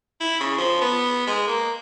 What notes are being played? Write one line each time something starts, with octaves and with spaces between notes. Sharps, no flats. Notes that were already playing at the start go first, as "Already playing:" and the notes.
E4
C#3
F3
B3
G#3
A#3